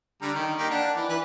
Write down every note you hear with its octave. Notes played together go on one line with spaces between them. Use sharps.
D3 G3 A#5
D#3
A#3 D#4 G4
D4 F#5
E3
E3 B4